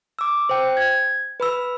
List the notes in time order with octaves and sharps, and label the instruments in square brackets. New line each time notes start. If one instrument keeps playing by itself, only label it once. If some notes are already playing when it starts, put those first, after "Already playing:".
[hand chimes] D6 E6
C5 G5
G#6
B4 B5 E6